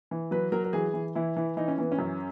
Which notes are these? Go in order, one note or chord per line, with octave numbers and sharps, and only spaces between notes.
E3
F#3 B4
F#3 A#4
A#4
E3 G#4
E3
E3 E4
E3
E3 D#4
C#4
E3 B3
C#4
F#2